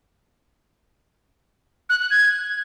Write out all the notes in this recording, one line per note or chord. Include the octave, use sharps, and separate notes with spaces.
F#6
F#6
G#6